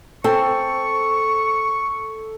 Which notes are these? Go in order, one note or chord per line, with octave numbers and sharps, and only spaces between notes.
C4 A4 C#6